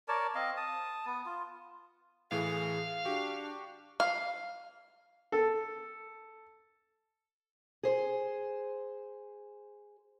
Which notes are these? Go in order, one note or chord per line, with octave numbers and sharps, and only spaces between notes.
A#4 C#5 D5 A5
C4 D#5 F5
A5 D#6
B3
F4
A2 E3 G#4 F5
D4 F#4 G4
F5
A4
G#4 C5